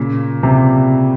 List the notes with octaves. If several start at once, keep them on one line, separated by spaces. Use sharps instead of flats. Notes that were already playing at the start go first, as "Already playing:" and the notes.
Already playing: A#2 C#3
C3